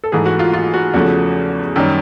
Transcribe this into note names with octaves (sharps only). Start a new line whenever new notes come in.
A4
G#2 E3 A3 G#4
F#4
F4
F4
F#4
E2 C#3 F3 A3 F#4
F#2 D#3 G3